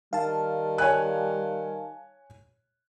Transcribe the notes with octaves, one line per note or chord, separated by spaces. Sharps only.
D#3 G3 F5 A5
C#5 G#5 F#6